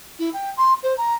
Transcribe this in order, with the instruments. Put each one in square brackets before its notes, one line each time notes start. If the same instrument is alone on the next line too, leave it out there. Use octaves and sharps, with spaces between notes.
[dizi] E4
G5
C6
C5
A#5